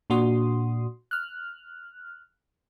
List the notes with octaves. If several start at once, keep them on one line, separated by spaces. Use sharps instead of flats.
A#2 D4 F#4 C6 D#6
F6 F#6